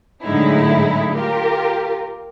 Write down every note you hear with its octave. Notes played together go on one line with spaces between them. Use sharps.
A2 D3 F#3 G#3 D#4 E4
F4 G4 A#4